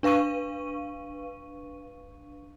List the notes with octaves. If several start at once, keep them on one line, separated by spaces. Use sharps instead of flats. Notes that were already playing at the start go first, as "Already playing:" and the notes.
D4 B4 F5 C#6 D#7